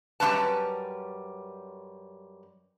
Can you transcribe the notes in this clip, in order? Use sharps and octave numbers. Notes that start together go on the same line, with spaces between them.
F#2 G3 G#3 C#4 B4 A5